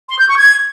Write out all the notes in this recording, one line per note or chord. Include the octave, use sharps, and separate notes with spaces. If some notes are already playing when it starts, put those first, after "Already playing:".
C6
G6
C#6
G#6